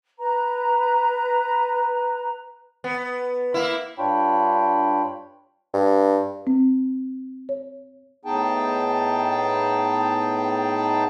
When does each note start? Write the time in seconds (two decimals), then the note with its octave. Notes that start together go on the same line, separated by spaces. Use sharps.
0.19 B4 A#5
2.84 B3
3.54 A#3 E4
3.98 G2 D4 F4 C#5 G5 B5
5.74 G2
6.47 C4
7.49 C#5
8.25 A2 B3 D#4 G#4 G5 A5